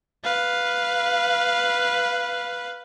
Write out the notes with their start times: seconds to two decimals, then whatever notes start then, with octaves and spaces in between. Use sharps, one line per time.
0.24 B4 F5